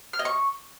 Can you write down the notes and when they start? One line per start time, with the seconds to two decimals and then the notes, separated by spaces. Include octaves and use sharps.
0.13 F6
0.19 D#5
0.25 C#6